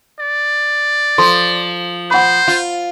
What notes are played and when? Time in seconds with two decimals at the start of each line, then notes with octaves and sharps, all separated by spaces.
0.20 D5
1.18 F3 A4 C6
2.11 C5 F#5 B5
2.48 F4